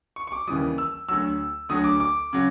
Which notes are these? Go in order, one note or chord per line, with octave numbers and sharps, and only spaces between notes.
C#6
C#6
D6
D#2 C#3 E3 G3 D#6
E6
D2 D3 F#3 E6
D2 D3 F#3 D#6
D6
D6
C#3 F#3